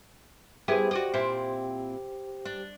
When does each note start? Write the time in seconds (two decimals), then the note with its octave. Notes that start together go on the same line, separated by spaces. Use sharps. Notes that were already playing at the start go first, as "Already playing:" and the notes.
0.68 B3 E4 G4 G#4 C5
0.91 F#4 D5 D#5
1.14 A#2 C4 E4
2.45 D4